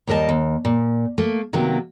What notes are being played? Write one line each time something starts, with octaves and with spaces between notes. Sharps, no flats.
D#2 G3 A#4 D#5 A5
D#2
A#2
A3 A#3
C3 D#3 F#3 A#3 B3